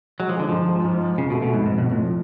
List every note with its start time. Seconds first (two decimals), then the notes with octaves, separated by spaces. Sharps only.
0.20 F#3 G#3
0.29 F3
0.36 D3 G#3
0.49 G#2 F3
0.69 G#3
0.84 G#2
1.01 G#3
1.18 F2 C#3
1.30 B2
1.34 A3
1.42 B2
1.50 F2 G#2
1.66 G#2 F3
1.78 F2 B2
1.91 A2
1.99 F3